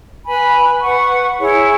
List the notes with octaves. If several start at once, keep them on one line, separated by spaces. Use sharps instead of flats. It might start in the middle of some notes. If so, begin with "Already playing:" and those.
B4 G#5 B5
B4 F#5 C#6
E4 G#4 C#5